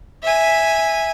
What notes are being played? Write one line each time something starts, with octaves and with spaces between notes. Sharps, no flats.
E5 G#5